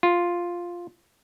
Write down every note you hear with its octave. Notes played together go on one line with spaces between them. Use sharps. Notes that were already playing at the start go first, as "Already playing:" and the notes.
F4